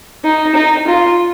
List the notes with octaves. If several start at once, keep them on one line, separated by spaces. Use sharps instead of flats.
D#4
D#4
F4